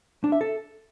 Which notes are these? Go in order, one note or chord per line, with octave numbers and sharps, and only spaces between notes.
D4
E5
A4